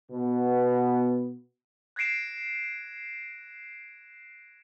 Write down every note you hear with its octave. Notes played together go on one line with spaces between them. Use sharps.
B2 B3
F#6 G#6 A#6 C7 D7 E7